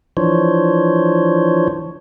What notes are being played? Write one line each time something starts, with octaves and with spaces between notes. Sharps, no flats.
E3 F3 D4 C5 C#5